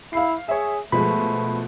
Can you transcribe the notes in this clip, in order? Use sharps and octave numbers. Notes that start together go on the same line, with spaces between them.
E4 F5 C7
G#4 C#5 E5
B2 F3 G#3 A3 B5